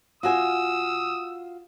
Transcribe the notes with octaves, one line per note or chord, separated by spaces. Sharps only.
F4 F#4 G#5 D#6 E6